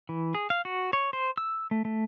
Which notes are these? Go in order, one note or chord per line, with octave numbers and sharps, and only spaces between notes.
E3
G#4
F5
F#4
C#5
C5
E6
A3
A3